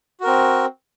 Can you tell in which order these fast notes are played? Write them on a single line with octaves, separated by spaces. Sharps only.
F#4 A#4 C4